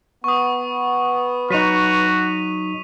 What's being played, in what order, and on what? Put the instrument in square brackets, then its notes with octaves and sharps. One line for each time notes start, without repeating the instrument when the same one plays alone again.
[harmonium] B3 [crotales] C#6 D#6
[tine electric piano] F#3 D#4 [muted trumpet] F#4 [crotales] B6 D#7 F7